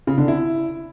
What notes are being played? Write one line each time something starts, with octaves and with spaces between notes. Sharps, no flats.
C#3
D3
E4